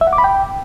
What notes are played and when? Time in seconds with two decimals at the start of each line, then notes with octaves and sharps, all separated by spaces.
0.01 E5
0.07 F#5
0.13 D6
0.18 B5
0.24 G5